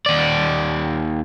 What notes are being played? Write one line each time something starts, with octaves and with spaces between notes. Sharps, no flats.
D#2 D5